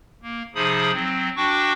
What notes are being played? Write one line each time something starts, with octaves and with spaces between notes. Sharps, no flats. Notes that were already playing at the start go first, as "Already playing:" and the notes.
A#3
C3 F3 D#4 G#4 B5 D#6
F#3 C4
D4 F#4 G5 C#6 D6